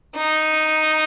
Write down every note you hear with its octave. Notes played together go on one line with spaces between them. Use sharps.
D#4